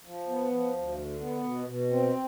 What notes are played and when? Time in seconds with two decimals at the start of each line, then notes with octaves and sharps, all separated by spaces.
0.05 F3
0.28 B3
0.51 F3
0.75 D2
0.97 D3
1.20 B3
1.43 B2
1.66 B2
1.90 C4